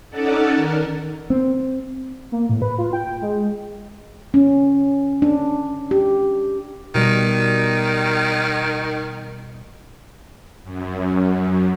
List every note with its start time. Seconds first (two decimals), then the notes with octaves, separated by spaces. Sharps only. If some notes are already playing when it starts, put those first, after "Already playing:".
0.10 C#4 D#4 A4 D5 F#5 A5
0.53 D#3 A#4
1.30 C4
2.32 A#3
2.49 A2
2.62 B4
2.78 F4
2.93 G5
3.22 G#3
4.34 C#4
5.22 D4
5.91 G4
6.95 B2 D#3 G3
10.64 F#2